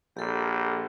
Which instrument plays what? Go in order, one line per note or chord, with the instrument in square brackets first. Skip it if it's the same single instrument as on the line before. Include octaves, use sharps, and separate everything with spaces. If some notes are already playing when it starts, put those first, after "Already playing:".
[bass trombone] A#1 [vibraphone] G4 A4